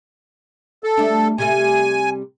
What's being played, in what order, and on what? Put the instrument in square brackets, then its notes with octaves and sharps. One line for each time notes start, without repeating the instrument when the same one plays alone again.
[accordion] A4
[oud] G3 A3 D4
[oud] C3 G3 A3 [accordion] G#5